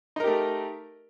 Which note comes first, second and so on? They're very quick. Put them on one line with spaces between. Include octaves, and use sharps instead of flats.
D#4 A#4 G4 A3